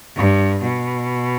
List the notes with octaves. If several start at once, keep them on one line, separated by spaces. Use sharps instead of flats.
G2
B2